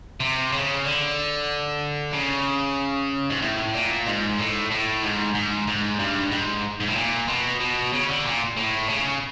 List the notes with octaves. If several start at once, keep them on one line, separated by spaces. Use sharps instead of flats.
C3
C#3
D3
C#3
G#2
A2
A#2
G#2
A2
A2
G#2
G#2
G#2
G2
G#2
G#2
A2
A#2
B2
B2
C#3
D3
A#2
A2
C#3